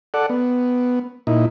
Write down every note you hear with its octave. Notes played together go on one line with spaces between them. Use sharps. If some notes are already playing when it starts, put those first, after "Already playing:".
A4 D5 F#5
B3
A#2 D#4 E4